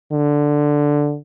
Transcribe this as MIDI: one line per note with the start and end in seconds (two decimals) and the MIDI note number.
0.12 1.17 50